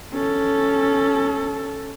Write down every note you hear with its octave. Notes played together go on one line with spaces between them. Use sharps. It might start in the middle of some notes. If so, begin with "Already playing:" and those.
C#4 A4